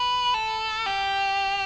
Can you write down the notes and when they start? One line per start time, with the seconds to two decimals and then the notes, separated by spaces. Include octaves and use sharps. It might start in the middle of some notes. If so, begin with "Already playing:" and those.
Already playing: B4
0.34 A4
0.86 G4